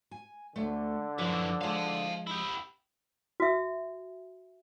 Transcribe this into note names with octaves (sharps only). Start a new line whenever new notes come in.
G#5
D2 D3 A3
F#2 E3 F3
F3 G#3 F5 A5
E4 G4
F#4 E5